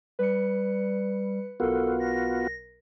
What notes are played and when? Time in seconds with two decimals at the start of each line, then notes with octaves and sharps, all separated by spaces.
0.19 G3 B4 C#7
1.60 B1 B3 F4 F#4 A4 A#4
2.00 A#6